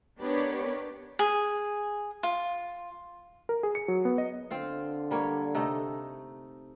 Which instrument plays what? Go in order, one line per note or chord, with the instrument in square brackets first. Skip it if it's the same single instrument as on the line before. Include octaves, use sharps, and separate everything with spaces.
[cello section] B3 D4 G4 A#4 B4 C#5
[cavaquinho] G#4
F4
[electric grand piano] A#4
G#4
C#7
F#3
B3
D#5
[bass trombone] D3 [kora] C4 F4 F5
[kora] G3 A#3 C#5
C3 A3 D#4